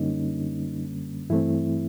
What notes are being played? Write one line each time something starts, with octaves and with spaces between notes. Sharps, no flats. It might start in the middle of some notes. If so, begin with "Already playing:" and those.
Already playing: F#2 D3 G3 A#3 C#4 D#4
G2 E3 A3 C4 E4